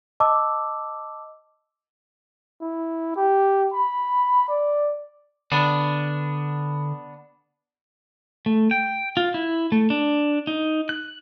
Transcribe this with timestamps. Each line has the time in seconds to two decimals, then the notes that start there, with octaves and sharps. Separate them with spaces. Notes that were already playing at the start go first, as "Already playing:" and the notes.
0.20 D#5 A5 D6 E6
2.61 E4
3.16 G4
3.73 B5
4.49 D5
5.52 D3 B3 D4
8.46 A3
8.71 G5
9.17 F4
9.34 E4
9.72 A3
9.90 D4
10.47 D#4
10.89 F#6